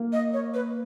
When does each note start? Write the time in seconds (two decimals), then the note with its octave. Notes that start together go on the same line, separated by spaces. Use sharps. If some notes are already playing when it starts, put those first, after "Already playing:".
Already playing: A#3
0.12 D#5
0.33 C#5
0.54 B4